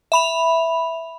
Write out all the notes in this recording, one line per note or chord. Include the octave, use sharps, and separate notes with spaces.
E5 B5 F7